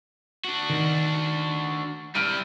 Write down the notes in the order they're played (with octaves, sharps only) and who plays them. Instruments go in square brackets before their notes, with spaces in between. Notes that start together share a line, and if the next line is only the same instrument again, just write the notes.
[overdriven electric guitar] D4 F#4
[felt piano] D#3
[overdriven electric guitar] G3 E4 [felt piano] F6 D7 D#7